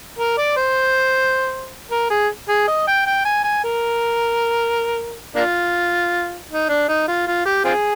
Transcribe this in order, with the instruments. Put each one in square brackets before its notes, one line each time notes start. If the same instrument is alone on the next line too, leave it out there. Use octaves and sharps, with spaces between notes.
[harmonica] A#4
D5
C5
A#4
G#4
G#4
D#5
G5
G5
G#5
G#5
A#4
A#3 D4 F4
D#4
D4
D#4
F4
F4
G4
C4 F4 G#4